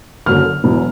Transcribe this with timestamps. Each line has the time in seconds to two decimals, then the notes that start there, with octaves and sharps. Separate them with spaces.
0.26 F#1 F#2 D3 F6
0.64 E1 E2 B2 F#3